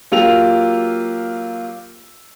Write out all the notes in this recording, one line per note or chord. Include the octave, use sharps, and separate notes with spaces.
F#3 A#3 F4 G4 E6 F7